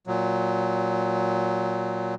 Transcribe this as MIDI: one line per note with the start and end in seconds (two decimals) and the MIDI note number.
0.07 2.15 46
0.07 2.15 54